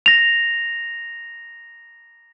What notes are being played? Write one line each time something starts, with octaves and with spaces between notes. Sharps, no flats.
A#6 F7